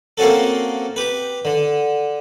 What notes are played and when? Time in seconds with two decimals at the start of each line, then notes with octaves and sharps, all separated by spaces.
0.18 A#3 C4 C#4 F#4 A4
0.96 G4 B4
1.45 D3